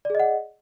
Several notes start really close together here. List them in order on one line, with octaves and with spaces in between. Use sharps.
D5 G#4 D#5 F#5